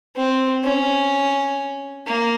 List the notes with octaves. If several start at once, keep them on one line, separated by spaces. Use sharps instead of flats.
C4
C#4
A#3